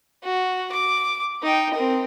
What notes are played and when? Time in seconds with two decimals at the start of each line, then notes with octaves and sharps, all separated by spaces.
0.24 F#4
0.72 D6
1.43 D#4 G5
1.74 C4 A#4